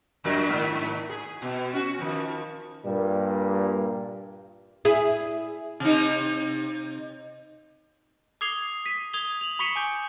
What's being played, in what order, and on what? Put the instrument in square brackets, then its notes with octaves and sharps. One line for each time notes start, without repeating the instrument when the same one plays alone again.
[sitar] F#2 F3 A#4
G#2 D#3
G#4
B2
C#4 F#4
D#3 F3
[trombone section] G2 A#2 G3 A#3
[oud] E4 G#4
[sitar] C3 D#4
[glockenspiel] D6 D#6 G#6 C7 F7 G7
B6 D#7
D#6 G#6 F7 G7
F7 F#7
B5 C#6 B6 C#7 D#7 E7
G#5 D6 G6